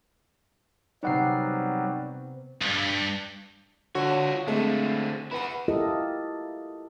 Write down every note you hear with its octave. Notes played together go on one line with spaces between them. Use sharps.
C3 F#3 G3 B3 D#4 F#5 C7
B1 G2
D3 F4 F#4 C#5
D3 G#3 A3 C4 A4 E5
E4 B4 F#5 B5
E4 F4 G4 A4 A#4 D#5